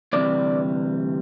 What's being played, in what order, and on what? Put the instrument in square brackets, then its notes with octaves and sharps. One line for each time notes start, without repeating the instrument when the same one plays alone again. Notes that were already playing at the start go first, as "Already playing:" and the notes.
[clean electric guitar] D2 C3 E3 G3 D5